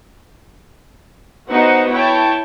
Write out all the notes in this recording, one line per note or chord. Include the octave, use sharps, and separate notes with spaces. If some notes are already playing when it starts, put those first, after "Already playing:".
B3 D#4 F#4 C5 E5 F#5
E4 C#5 G5 A5